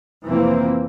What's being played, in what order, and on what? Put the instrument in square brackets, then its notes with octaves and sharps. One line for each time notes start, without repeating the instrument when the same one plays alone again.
[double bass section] F1 E3 A#3 C4